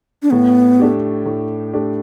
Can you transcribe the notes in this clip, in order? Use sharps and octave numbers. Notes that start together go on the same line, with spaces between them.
D4
A2 B3
A3 D4 G4
A2
A3 D4 G4